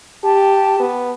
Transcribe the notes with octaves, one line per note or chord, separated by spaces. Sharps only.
G4 A5
B3